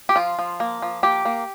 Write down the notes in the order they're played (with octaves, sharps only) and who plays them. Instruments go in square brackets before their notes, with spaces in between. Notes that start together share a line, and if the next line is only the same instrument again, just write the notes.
[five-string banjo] G4
F3 F4
F3
A#3
F3
A#3 G4
A#3